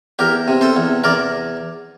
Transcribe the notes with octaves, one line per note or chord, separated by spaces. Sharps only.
E2 G4 A#4
C3
A4 C5
E2
E2 A#4 D5